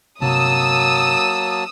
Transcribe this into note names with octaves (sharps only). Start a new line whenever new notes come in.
G1 C3 F#3 A#3 A5 D#6 E6